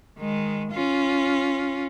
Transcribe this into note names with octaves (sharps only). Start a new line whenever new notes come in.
D#3 G#3
C#4 F4